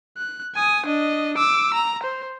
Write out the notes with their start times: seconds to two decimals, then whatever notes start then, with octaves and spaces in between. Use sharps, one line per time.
0.17 F#6
0.55 G#5 D#6
0.86 D4 D#5
1.38 D6 E6
1.74 A#5
2.03 C5